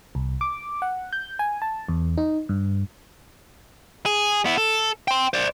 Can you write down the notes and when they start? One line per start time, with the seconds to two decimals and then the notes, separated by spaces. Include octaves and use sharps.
0.15 C2
0.41 D6
0.82 F#5
1.13 G6
1.39 G#5
1.62 A5
1.88 E2
2.18 D#4
2.49 G2
4.06 G#4
4.46 B3 E4
4.58 A4
5.08 G5 C6
5.34 C5 D5